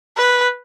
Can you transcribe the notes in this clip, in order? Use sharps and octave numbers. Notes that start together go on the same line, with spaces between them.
B4